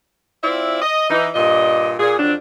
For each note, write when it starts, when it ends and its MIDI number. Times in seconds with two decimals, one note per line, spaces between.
0.44 0.80 60
0.44 0.80 64
0.44 0.80 65
0.44 0.80 74
0.44 0.80 76
0.82 1.07 75
1.10 1.27 52
1.10 1.27 63
1.35 1.93 43
1.35 1.93 46
1.35 1.93 75
1.99 2.14 46
1.99 2.14 68
2.19 2.33 41
2.19 2.33 54
2.19 2.33 60
2.19 2.33 62